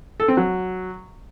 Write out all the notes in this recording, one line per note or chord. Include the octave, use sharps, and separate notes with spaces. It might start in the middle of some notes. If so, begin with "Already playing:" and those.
A4
C4
F#3